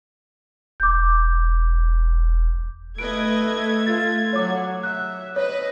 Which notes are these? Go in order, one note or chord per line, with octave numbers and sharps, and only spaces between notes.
E1 D6 G6
A3 B4 D#5 G#6 D7
F4 A6
F#3 C#5 D6
E5 F#6
B4 C#5 D#5